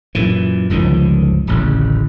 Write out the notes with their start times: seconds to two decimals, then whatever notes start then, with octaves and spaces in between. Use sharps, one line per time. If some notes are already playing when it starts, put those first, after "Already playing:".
0.15 F#2 A#2 E3
0.70 G1 C#2 D#3 F3
1.47 D1 A1 C#3